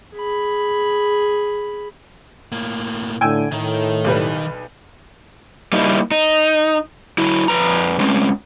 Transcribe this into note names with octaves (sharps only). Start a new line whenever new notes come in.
G#4 B5
A2 A#3
A2 D3 G5 G#5 E6
A2 D#3 D#4
B1 G3 B4
G3 A#3 D#4 E4
D#4
F#3 E4
F2 B4 A#5
G#3 C4 C#4